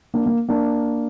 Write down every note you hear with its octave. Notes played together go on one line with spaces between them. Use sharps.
A#3 D4
A#3
A#3 D4